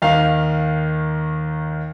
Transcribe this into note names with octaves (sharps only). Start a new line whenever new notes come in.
D#2 D#3 F5